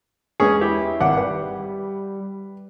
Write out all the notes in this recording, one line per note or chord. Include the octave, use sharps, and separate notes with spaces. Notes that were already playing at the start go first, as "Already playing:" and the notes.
E2 G#3 B3 C#4 G#4
E4 G4
G#1 F#5 D6
G3 B4